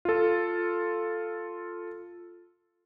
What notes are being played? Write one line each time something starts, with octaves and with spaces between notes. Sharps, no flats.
F4 A4